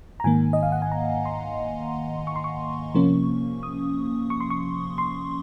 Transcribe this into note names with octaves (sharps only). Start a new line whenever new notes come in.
A#5
G#2 D#3 A#3 G#5
D#5
F5
F#5
G#5
A#5
C6
C#6
C6
C#6
C3 F3 A#3 C#4
D#6
C#6
C6
C#6
C6